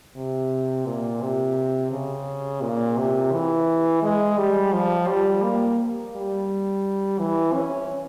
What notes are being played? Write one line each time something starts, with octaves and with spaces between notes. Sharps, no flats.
C3
A#2
C3
C#3
A#2
C3
E3
G#3
G3
F3
G3
A#3
G3
E3
C#4